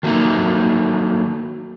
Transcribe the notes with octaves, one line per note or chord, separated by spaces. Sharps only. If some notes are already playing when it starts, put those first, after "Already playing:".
D#3 F#3 A3 A#3 D#4